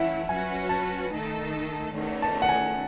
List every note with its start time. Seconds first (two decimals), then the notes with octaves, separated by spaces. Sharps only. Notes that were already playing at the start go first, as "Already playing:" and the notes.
Already playing: E3 A3 C#4 E4 E5 F#5
0.28 F#3 C#4 F#4 B4 G#5
0.69 A5
1.11 D#3 A3 D#4 A4
1.94 E2 D#3 A3 C#4
2.22 A5
2.42 F#5
2.49 G#5